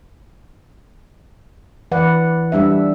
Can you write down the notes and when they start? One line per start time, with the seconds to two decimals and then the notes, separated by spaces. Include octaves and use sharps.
1.91 E3 B4 D5 F#5
2.52 G3 D4 E5